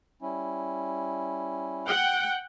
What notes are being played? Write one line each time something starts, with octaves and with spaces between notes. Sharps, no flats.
G3 C#4 E4
F#5 G5